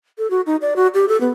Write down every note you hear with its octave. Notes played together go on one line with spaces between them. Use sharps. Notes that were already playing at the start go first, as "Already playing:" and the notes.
A4
F#4
D#4
D5
F#4
G4
A4
B3